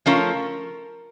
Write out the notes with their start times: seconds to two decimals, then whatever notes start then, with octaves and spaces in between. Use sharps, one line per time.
0.06 F3 A3 C#4 F4 A#4